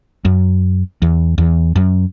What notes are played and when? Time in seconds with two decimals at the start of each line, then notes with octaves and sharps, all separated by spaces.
0.25 F#2
1.02 E2
1.38 E2
1.76 F#2